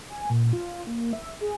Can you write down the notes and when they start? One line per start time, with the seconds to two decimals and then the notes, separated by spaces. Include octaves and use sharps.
0.10 G#5
0.30 A#2
0.53 F4
0.87 A#3
1.13 E5
1.41 G#4